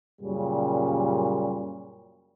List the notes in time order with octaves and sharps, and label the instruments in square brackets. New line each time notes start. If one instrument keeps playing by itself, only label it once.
[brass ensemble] F#2 A#2 C#3 G3